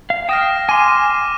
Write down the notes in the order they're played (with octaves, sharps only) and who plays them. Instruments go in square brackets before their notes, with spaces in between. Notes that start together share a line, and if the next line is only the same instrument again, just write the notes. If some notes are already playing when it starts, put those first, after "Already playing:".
[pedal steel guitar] F5
[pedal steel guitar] G5 D#6 [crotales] F6 A#6 E7
[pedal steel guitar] G#5 C6 [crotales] D6 D#7